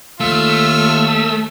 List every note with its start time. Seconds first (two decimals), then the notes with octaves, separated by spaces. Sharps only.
0.20 D#2 A3 F4 E6